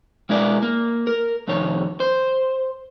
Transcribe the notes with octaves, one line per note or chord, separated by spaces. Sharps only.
B2 G#3 E4 A#4 D5
A#3
A#4
C2 F2 D#3 C#5
C5